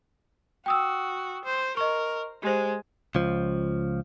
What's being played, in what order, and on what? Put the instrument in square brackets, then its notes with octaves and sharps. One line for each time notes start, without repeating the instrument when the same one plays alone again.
[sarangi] F#4 [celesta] G5 D#6 E6
[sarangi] C5
[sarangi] A#4 [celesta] D#5 C#6
[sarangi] G#3 [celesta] G4 C5
[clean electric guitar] C#2 F3